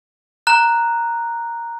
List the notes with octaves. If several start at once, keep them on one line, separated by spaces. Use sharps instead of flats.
A#5 F#6